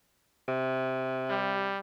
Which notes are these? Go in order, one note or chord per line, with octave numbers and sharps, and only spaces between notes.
C3
G3